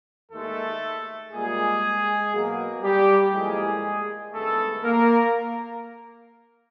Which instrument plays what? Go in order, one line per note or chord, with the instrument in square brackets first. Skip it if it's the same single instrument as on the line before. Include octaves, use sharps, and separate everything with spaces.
[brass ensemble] D#2 D#3 G#3 A3 A4
A#2 G3 G#3 A#3 G#4
B2 F#3 A#3
G3 G4
A2 F3 G#3 A#3 G#4
G2 D#3 G#3 A3 B3 A4
A#3 A#4